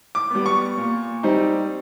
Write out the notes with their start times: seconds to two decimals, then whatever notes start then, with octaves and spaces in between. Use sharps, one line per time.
0.15 D6
0.30 G3 B3
0.46 C#6
0.77 A#2
1.23 G3 C4 D#4